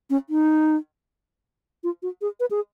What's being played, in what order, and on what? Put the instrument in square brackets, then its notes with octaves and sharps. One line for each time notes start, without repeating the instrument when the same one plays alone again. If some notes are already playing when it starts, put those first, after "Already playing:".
[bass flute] C#4
D#4
F4
F#4
G#4
B4
G#4